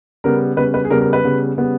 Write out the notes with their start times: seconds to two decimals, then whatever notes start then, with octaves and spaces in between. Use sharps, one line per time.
0.24 C#3 G3 B3 A#4
0.56 C#3 G3 B3 B4
0.74 B4
0.85 G#4
0.90 C#3 G3 B3 A#4
1.01 A#4
1.13 B4
1.24 C#3 G3 B3
1.57 C#3 G3 B3